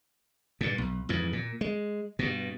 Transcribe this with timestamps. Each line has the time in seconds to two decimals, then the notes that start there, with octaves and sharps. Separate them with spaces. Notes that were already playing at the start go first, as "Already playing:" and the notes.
0.61 G2 A#2
0.78 B1
1.09 F2 G#2 E3
1.33 A#2
1.61 G#3
2.19 G2 B2